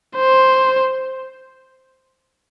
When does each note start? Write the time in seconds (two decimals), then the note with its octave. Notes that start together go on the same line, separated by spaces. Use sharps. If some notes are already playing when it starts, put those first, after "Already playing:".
0.16 C5